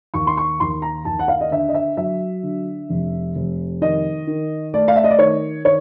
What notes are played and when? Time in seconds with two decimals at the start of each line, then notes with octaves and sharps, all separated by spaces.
0.14 D#2 C#6
0.27 C6
0.37 C#6
0.60 D#2 C6
0.82 A#5
1.05 D#2 A5
1.19 F#5
1.28 F5
1.41 D#5
1.51 D3 E5
1.69 D#5
1.74 E5
1.97 F#3 E5
2.43 D3
2.89 F1
3.35 F1
3.81 D#3 D#5
4.27 D#3
4.74 A3 D5
4.88 F5
4.96 E5
5.04 D#5
5.11 D5
5.19 D#3 C#5
5.65 D#3 C#5